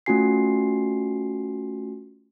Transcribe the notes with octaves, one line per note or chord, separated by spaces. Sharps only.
A3 C#4 F4 F#4 G#5 C7